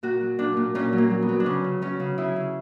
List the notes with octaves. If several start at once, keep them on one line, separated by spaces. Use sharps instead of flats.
A#2 F#4
F#3
A#2 D4
A#2
A#2 C#4
F#3
A#3
F#3
B3
F#3
D4
C#3 C#4
C#3
F#3 C#4
C#3
C#3 E4
C#3